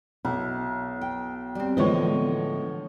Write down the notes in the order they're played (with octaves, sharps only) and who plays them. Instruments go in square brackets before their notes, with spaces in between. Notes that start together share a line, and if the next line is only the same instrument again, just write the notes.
[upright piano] B1 [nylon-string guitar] E4
[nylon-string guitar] G5
G3 C4
[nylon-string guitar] A2 D3 D#5 [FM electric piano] E3 G#3 B3 [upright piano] F3 C#5